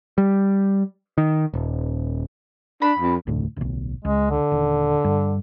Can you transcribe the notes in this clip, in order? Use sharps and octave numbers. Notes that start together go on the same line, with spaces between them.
G3
D#3
D#1
D4 B5
F2
F1 D2 A2
D1 B1
C#2 G#3
D3
D#1
G2